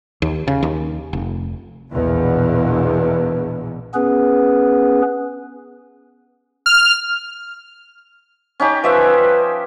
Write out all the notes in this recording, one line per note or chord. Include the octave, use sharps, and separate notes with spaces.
D#2
C#3
D#2
F1
A#1 E2 B2
B3 C#4 G#4 B4
F6
C#4 D#4 G4
F3 B4 D#5 E5